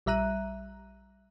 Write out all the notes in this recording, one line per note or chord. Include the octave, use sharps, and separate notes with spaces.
A#1 G3 E5 A#5 F#6 D#7